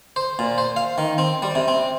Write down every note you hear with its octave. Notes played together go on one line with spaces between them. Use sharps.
C5
A#2
C5
F5
D#3
C4
G3
C3
C4